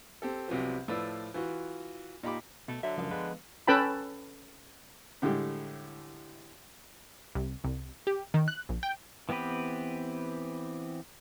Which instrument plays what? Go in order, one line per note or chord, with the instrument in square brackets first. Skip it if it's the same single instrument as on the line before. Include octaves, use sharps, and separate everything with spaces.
[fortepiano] C4 G4 A4
C2 C3 F3 F#3 B3
A2 F3 F4 B4 D5 E6
E3 F4 F#4
A#2 D#4 G4 B5 D6
[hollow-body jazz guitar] B2 [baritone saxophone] A3
[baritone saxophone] D3 [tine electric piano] F#3 [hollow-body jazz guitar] E5
[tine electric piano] C#2 F#2 [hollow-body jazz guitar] F3 F5
[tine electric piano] G#3 B3 B4
[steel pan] C#4 A4 B4 G5 A5 B5
[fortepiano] A2 D3 G3 G#3 G4
[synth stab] C2
C2
G4
D#3
F#6
A#1
G5
[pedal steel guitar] E3 B3 C4 G4 B4